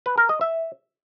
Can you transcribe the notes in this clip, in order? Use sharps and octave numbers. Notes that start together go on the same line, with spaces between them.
B4
A#4
D#5
E5